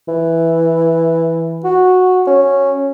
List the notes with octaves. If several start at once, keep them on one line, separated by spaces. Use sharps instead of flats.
E3
F#4
C#4